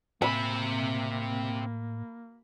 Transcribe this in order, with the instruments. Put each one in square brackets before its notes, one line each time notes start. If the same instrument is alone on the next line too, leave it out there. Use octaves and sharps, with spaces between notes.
[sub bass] A2 [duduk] A#3 [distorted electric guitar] C4 E5 [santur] B5